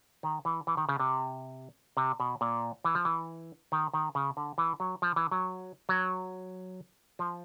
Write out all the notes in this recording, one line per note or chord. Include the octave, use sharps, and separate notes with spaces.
D#3
E3
E3
D#3
C#3
C3
C3
B2
A#2
E3
F3
E3
D#3
D#3
C#3
D3
E3
F#3
F3
E3
F#3
F#3
F3